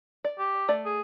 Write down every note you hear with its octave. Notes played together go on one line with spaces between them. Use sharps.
D5
G4
A3 D5
G#4